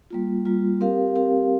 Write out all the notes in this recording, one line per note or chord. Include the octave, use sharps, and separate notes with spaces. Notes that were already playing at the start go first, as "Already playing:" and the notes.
G3 A#3 F4
G3 A#3 F4
C4 G4 A#4 F5
C4 G4 A#4 F5